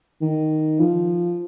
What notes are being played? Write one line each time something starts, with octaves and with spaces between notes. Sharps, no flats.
D#3
F3